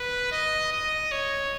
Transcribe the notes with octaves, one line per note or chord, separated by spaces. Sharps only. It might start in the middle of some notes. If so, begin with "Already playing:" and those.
Already playing: B4
D#5
D#5
C#5